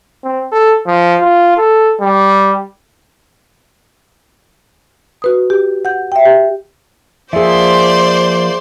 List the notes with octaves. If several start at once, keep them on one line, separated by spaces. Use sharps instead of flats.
C4
A4
F3
F4
A4
G3
F#4 B4 D#6
G4
F#5 G6
E5 G5
G4
F3 A#3 G#4 C5 D5 E5 C6